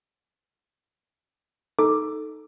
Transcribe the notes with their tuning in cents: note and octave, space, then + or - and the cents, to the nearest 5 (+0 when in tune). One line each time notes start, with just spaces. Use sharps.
D#4 +0 A4 +0 D6 +0